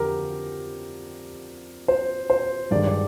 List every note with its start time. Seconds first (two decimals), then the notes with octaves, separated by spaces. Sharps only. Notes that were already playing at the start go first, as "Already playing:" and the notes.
Already playing: F2 D3 F3 G4 A#4
1.88 C5
2.30 C5
2.71 G2 D#3 G#3 D5
2.87 D5